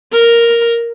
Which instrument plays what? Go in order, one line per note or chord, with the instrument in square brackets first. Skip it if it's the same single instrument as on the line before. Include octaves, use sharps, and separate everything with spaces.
[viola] A#4